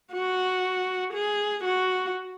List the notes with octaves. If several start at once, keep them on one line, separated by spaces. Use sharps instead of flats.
F#4
G#4
F#4